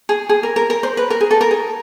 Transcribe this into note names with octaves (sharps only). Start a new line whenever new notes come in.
G#4
G#4
A#4
A#4
A#4
C5
B4
A#4
G#4
A4
A#4
G#4